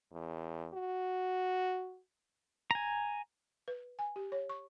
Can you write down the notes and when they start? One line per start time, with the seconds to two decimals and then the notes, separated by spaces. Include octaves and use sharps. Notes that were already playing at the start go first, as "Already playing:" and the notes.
0.13 E2
0.74 F#4
2.71 G#5 A#5
3.68 B4
3.99 G#5
4.16 G4
4.32 C#5
4.49 C#6